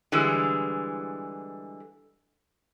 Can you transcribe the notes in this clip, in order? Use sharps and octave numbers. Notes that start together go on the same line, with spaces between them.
D3 E3 G3 G#3